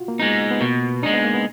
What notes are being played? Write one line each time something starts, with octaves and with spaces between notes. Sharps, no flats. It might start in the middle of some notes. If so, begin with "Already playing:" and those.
Already playing: F4 F#4
A#3
G#3 B3 D#4
B3
B2 A#3
G#3 D4 D#4
B3
A#3
B3